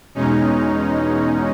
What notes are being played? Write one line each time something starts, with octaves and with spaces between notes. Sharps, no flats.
E2 B2 G#3 C#4 D#4